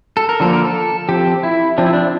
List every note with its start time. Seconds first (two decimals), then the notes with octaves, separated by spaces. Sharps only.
0.17 A4
0.29 A#4
0.40 D3 F3 A#3 A4
0.53 A#4
0.65 A4
1.09 F3 C4 G4
1.43 E4
1.78 F3 C4 D4
1.86 E4
1.93 D4